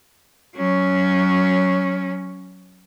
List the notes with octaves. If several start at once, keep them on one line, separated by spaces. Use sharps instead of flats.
F#3 C#4